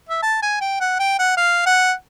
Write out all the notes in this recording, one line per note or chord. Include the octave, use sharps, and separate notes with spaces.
E5
A5
G#5
G5
F#5
G5
F#5
F5
F#5